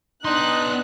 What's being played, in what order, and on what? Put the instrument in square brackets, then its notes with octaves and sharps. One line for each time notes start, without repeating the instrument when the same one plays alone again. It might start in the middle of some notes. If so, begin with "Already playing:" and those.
[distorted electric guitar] B3 C6 [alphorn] D4 [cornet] D#4 [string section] F#6